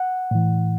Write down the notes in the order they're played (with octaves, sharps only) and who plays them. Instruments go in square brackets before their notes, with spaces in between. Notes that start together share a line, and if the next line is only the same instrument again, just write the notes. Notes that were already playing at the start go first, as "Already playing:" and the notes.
Already playing: [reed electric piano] F#5
A2 E3